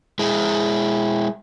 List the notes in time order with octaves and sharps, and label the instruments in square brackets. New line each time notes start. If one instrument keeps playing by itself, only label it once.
[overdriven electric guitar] G#3 E4